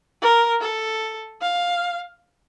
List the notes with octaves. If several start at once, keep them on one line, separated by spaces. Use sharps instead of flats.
A#4
A4
F5